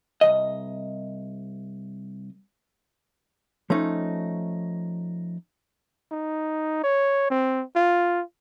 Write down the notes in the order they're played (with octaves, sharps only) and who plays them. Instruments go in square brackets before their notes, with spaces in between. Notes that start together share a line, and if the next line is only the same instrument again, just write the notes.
[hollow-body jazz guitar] C2 B2 D#5
F3 A3 C#4 D#4
[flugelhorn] D#4
C#5
C4
F4